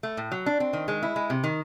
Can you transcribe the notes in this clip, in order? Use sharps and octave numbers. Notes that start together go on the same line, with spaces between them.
A3
A2
F#3
D4
C4
D#3
G#3
E4
G#3
C3
D#3